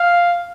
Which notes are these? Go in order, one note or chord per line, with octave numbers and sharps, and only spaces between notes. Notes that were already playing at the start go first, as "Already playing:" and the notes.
Already playing: F5